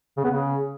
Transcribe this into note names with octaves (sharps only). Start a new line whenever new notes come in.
C#3
B3
C#3